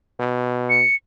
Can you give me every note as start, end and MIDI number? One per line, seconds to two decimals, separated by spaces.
0.20 0.83 47
0.70 0.95 97